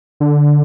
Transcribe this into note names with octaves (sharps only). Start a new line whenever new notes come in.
D3